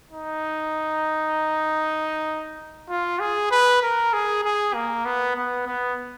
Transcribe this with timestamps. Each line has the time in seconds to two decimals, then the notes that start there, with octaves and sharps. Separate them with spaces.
0.11 D#4
2.90 F4
3.20 G#4
3.51 B4
3.83 A#4
4.13 G#4
4.44 G#4
4.74 A#3
5.05 B3
5.37 B3
5.67 B3